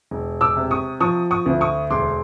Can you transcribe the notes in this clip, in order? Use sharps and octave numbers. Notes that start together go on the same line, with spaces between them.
E1
D6 E6
C3
C#6 D#6
F3 C#6 D#6
C#6 D#6
D2
C#6 D#6
E1 C6 D6